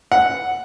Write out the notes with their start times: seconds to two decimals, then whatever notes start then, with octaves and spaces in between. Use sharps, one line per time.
0.12 F#5